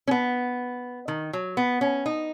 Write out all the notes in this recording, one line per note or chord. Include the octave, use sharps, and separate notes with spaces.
C#4
B3
D#3
F#3
B3
C#4
D#4